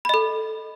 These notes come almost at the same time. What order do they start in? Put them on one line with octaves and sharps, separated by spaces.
B5 D#5 A4